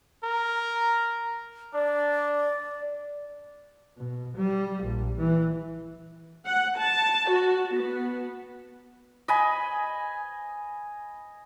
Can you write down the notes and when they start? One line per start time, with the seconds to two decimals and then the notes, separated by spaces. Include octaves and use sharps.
0.23 A#4
1.74 D4 D5
3.98 B2
4.37 G3
4.83 A#1
5.19 E3
6.46 F#5
6.78 A5
7.31 F#4
7.75 B3
9.28 D#5 G#5 B5